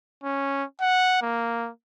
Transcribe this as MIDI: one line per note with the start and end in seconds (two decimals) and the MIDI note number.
0.24 0.64 61
0.81 1.19 78
1.22 1.70 58